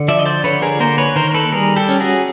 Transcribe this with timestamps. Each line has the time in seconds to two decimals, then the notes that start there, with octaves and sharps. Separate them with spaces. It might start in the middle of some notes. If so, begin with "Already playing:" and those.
Already playing: D3
0.08 F3 D5 E5
0.19 D#5
0.25 C5 D5
0.44 D3 B4 C#5
0.62 G#4 A#4
0.80 A#3 A#4 C5
0.98 B4 C#5
1.16 D#3 A#4 C5
1.30 A#4
1.34 A4 B4
1.52 G3 G#4 A#4
1.76 G4 A4
1.89 C#4
2.00 F#4 G#4